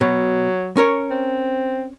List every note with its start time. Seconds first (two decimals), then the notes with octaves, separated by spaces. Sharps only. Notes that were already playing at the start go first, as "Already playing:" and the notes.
0.01 B2 F#3
0.77 C#4 A#4 C#5
1.10 C4